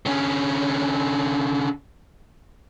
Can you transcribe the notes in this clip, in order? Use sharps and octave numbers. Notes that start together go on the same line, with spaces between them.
D3 C#4